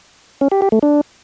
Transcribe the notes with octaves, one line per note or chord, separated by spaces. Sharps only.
C#4
G4
G4
A3
D4